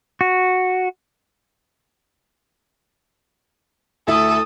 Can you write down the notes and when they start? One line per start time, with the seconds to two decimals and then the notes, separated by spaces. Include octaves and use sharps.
0.21 F#4
4.07 D2 E4 A4 D#6